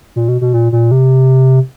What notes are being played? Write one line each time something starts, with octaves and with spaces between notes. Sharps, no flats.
A#2
B2
B2
A#2
A#2
C3